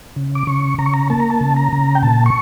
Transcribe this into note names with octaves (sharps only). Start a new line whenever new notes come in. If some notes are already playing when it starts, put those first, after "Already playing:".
C#3
D6
C#3 C#6
C#3 A#5
C#6
A#5
A#3 A5
A#5
A5
C#3
A#5
C#3
G5
A#2 A5
C#6